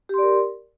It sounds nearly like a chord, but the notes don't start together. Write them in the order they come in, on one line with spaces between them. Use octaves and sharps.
G4 C6 D5 A#4